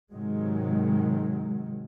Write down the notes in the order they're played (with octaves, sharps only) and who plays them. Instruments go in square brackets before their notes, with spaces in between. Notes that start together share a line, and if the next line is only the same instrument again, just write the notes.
[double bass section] G#2 C3 D#3 F#3 G#3